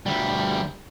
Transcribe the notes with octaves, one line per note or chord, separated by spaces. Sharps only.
D2 G3